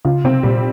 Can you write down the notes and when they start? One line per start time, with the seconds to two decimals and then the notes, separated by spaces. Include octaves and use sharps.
0.05 C#3 F4
0.25 C3 C4
0.43 A#2 G3